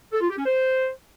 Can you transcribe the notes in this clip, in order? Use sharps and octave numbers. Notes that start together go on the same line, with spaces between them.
A4
F4
G4
C#4
C5